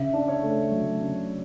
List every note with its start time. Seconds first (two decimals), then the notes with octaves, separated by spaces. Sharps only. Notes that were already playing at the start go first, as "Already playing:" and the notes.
Already playing: C#3 E5
0.14 D4
0.28 C#5
0.43 A3
0.72 F#3
1.01 C#3